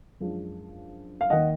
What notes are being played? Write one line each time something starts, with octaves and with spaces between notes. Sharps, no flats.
F#2 F3 G#3 D4
F5
D#2 D#3 A#3 D#5 F#5